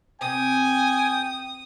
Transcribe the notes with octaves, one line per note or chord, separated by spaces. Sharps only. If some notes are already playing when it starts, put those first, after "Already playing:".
C3 G5 G#5 D#6